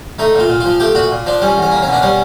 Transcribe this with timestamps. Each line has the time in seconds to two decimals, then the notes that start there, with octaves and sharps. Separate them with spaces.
0.19 A3 D#4
0.35 A#2 F4
0.49 A#2
0.60 F4
0.65 F3
0.80 A3 G4
0.95 A#2 F#4
1.11 A#2
1.26 F3 D4
1.41 G3 C#4
1.57 E2
1.62 C#4
1.72 A#3
1.82 C#4
1.88 B2 D4
2.02 G3 C#4